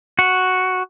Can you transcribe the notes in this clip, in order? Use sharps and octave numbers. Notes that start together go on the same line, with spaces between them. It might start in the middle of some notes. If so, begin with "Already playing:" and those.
F#4